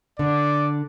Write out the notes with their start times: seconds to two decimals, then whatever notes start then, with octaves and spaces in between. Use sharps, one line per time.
0.19 D3 D5